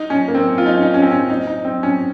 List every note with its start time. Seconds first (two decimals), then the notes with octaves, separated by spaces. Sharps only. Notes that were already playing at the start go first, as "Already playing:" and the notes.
Already playing: D#4
0.10 C#4
0.28 A#3
0.35 C4
0.58 F4
0.66 D#4
0.75 C#4
0.82 D#4
0.94 C#4
1.02 C4
1.11 C#4
1.30 D#4
1.47 D#4
1.65 C4
1.83 C#4